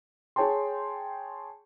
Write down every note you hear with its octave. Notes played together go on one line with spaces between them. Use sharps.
G#4 C#5 G5 A5 C6